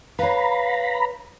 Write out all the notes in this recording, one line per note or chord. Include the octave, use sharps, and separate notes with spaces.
B4 C#5 F5 A#5 B5